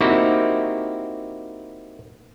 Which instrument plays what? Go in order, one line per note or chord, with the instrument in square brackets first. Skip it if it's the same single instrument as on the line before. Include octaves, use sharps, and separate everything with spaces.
[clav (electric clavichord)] A#3 C4 D#4 E4 F#4 G4